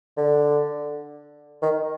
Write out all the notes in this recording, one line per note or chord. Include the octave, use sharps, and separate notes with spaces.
D3
D#3